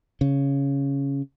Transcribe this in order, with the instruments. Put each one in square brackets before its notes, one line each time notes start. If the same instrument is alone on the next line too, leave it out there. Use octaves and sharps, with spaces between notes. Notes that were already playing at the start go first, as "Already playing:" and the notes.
[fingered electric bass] C#3